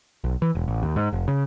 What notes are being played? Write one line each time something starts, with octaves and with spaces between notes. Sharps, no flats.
B1
E3
E1
A1
D#2
G#2
F1
C#3